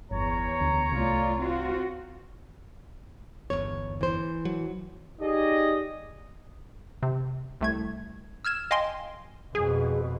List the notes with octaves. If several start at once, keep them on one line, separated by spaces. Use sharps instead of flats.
G1 E2 C#5 A#5
D2
C2 A3 F4 D5
C4 F4 F#4
G1 E2 C#5
E3 C5
F#3
D#4 G4 G#4 D5 D#5
C3
C2 A3 G#6
E6 F6 G#6 E7
D#5 F5 G5 G#5 C6
F2 B2 G#4